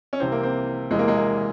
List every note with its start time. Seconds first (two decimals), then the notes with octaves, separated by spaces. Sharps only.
0.13 C#4
0.20 C2 C3 E3 C4
0.32 A#3
0.43 C4
0.91 E1 E2 C3 E3 G#3
0.99 A#3
1.08 G#3
1.17 A#3